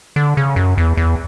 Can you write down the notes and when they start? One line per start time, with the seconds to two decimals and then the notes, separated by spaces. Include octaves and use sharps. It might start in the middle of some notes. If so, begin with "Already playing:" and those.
0.16 D3
0.37 C#3
0.56 F#2
0.78 E2
0.97 E2